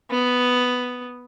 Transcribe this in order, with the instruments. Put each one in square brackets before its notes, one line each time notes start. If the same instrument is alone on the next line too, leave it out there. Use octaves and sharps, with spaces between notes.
[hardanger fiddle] B3